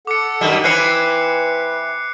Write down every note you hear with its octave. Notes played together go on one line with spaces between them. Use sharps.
A4 F#5 D6 C#7
F#2 D#3 G3
E3 C4 B4 F#6 C7 C#7